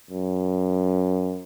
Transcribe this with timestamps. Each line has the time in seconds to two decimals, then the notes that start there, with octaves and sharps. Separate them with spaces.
0.11 F#2